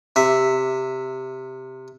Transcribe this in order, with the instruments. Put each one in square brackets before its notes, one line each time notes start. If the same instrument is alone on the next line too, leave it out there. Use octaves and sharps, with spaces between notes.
[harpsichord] C3 E5